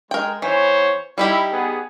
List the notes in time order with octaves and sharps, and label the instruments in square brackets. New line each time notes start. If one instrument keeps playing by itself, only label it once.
[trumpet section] G#3 [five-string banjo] A#4 G5
[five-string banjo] E3 [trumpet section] B3 C5 C#5
[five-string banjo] G3 D#4 G4 [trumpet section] E4
[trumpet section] B3 G#4